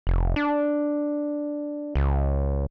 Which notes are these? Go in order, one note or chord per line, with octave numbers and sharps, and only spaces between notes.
F1
D4
C#2